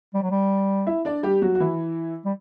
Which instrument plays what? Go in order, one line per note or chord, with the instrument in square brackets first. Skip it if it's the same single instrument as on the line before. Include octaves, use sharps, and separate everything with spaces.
[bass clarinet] G3
F#3
G3
[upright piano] E4 E5
D4 D5
G3 G4
F#3 F#4
F#4
E3 E4
[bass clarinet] G3